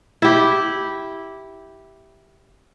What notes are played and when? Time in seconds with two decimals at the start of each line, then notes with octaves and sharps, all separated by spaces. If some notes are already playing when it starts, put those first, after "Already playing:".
0.22 E4 G4